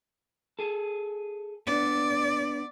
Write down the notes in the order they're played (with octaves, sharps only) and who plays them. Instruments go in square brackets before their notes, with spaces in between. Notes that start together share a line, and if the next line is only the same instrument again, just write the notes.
[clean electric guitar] G#4 A4
[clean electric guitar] B3 D4 [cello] D5